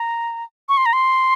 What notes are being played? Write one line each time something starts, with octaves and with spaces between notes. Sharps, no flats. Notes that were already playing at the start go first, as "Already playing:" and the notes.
Already playing: A#5
C#6
C6
A#5
C6